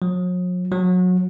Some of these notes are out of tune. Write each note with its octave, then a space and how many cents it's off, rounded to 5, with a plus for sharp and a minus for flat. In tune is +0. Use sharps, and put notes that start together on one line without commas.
F#3 -45
F#3 -25